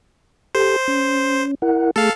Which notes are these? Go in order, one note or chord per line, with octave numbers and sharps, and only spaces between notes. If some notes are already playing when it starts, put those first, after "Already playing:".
G4 A4 C5
C#4
E4 A#4 F#5
A3 G#4 A4 F5